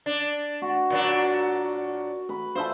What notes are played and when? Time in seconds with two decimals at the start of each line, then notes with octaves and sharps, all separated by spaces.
0.06 D4
0.62 F#4
0.90 A#2 F#3 D4
2.29 B4
2.55 F4 C5 E5 A5